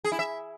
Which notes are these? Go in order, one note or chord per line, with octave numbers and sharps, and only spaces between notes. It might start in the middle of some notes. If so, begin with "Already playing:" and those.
G#4
E4
E5